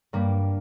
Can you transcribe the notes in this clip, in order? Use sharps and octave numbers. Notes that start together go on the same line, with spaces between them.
G2 G3 A#3